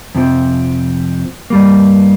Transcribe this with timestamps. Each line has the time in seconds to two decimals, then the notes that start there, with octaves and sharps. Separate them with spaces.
0.15 F2 C3 F3 C4
1.50 G2 G3 A#3